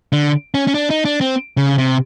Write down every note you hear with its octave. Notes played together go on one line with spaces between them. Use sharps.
D3
C#4
C#4
D4
D#4
D4
C4
C#3
C3